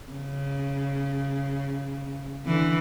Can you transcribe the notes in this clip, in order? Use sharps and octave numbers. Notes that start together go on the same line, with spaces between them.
C#3
D3 E3